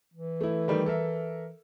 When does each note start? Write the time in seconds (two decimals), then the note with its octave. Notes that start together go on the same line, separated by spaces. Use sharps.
0.14 E3
0.41 A3 E4
0.68 D#3 G3 A3
0.86 A4 A#4 E5